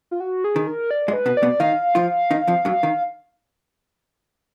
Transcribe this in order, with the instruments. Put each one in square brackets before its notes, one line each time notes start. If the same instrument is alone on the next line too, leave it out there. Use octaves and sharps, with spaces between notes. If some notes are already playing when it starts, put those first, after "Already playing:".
[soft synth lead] F4
F#4
G#4
[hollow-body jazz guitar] D#3
[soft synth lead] A#4
D5
[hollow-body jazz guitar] G#2 G#3
[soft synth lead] B4
[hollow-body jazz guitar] B2 B3
[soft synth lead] D5
[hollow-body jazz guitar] B2 B3
[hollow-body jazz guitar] D#3 D#4 [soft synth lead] F5
[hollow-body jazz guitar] F3 F4
D#3 D#4
F2 F3
F#2 F#3
D#3